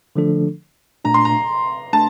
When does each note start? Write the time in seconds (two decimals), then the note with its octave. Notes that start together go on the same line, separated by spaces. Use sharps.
0.16 D3 F3 A3 D4 A4
1.04 A#2 A3 D4 A#5
1.14 C6
1.25 A#5
1.93 A3 D4 A5